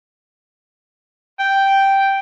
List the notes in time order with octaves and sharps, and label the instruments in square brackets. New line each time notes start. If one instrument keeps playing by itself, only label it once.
[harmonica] G5